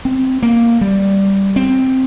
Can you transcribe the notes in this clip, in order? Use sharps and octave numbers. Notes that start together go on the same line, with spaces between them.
C4
A#3
G3
C4